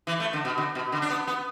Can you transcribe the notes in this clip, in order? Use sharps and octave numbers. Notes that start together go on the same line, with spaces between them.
E3
A3
D3
B2
D3
B2
D3
D4
B3
B3